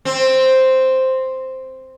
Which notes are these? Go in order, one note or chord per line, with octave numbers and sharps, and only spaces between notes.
C4